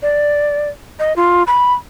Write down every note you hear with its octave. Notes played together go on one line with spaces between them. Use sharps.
D5
D#5
F4
B5